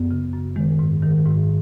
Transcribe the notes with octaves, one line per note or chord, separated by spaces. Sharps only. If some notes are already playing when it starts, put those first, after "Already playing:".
Already playing: F#2 B3
C#3
F#2
D#3 G#3
G#2
D#3
G#2